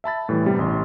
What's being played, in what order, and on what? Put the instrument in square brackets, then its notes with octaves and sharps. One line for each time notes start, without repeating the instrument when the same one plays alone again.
[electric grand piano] E5 A5 B5 A6
A2 E3 G3
G2 C3 G3 B3
A1 C6